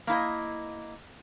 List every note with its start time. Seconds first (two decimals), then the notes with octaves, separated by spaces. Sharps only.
0.07 A#3 E4 D#5